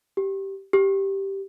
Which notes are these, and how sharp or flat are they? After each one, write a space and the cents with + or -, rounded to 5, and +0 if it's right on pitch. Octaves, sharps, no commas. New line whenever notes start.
G4 -10
G4 -5